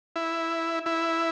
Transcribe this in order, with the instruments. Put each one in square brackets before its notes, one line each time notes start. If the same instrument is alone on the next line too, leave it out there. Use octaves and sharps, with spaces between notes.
[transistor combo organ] E4
E4